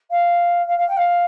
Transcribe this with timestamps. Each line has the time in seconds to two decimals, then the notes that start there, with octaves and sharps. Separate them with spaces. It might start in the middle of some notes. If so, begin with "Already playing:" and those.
0.10 F5
0.67 F5
0.78 F5
0.88 G5
0.96 F5